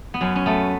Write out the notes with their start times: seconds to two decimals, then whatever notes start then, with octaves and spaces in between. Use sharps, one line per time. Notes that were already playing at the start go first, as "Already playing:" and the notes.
0.14 B3
0.21 F#2 C#4
0.36 C#4
0.46 A3 B3